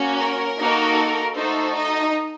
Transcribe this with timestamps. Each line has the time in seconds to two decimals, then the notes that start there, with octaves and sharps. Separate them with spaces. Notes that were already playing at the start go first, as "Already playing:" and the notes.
Already playing: A#3 C#4 F#4
0.18 A#4
0.58 A#3 D#4 F#4 A4
1.35 A3 D#4 F#4 A4 C5
1.74 D#4 D#5